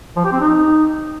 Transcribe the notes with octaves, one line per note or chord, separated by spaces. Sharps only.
F3
G4
C4
D#4